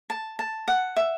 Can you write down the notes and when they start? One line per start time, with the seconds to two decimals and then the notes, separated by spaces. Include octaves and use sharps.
0.10 A5
0.39 A5
0.68 F#5
0.96 E5